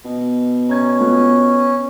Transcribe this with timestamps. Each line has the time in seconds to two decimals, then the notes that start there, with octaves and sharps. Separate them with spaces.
0.05 B2
0.69 C#4 A#5 G#6
0.99 B3 F4 A4